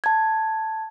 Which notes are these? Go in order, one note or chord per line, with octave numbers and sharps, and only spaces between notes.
A5 G#6